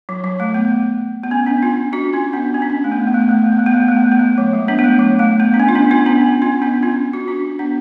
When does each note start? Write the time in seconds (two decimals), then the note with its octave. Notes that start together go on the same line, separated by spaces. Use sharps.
0.09 F#3
0.24 F#3
0.40 A3
0.54 B3
1.24 B3
1.31 C#4
1.46 B3 D4
1.62 C#4 F4
1.93 D4 F#4
2.13 C#4 F4
2.33 B3 D4
2.54 C#4
2.62 D4
2.70 C#4
2.84 A3
2.92 B3
3.00 A3
3.07 B3
3.14 A3
3.22 B3
3.29 A3
3.37 B3
3.44 A3
3.52 B3
3.59 A3
3.66 B3
3.74 A3
3.82 B3
3.88 A3
3.97 B3
4.04 A3
4.12 B3
4.19 A3
4.38 F#3
4.53 G#3
4.68 B3 D4
4.79 B3
4.84 A3
4.99 F#3
5.19 A3
5.40 B3
5.54 D4
5.60 C#4
5.69 F4
5.75 B3 D4
5.91 C#4 F4
6.06 B3 D4
6.21 C#4
6.42 C#4 F4
6.62 B3 D4
6.83 C#4 F4
7.13 F#4
7.28 D4 F#4
7.59 B3 D4